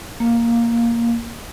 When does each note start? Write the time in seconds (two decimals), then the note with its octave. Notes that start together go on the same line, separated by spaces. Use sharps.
0.20 A#3